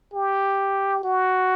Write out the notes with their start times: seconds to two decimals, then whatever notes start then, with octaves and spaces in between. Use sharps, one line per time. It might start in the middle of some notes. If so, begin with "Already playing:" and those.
0.14 G4
1.03 F#4